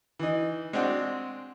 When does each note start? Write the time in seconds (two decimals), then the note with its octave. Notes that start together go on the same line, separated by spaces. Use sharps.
0.19 E3 D#4
0.73 G#3 C4 D4 F#4